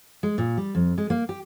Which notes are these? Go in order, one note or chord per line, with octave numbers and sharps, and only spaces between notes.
G#3
A#2
G3
F2
G#3
A#3
G4